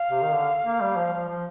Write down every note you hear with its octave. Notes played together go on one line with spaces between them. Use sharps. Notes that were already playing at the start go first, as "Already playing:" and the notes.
Already playing: F5
C3
D#3
D3
A#3
G3
F3
F3
F3